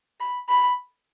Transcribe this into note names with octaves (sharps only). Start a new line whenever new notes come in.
B5
B5